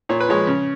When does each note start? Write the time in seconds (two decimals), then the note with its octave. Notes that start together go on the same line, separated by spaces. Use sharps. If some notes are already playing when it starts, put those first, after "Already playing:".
0.09 A#2 C#5
0.20 B4
0.29 F3 G#3 C#5
0.47 C#3